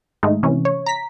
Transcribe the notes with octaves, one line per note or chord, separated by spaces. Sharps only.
G#2 D#3 G#3 A3 D#4
C3 E3 C#4
C#5
A#5 B6